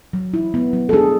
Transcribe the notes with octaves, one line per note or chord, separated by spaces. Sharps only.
F#3
E4
B3
F#3
A4
D4 G#4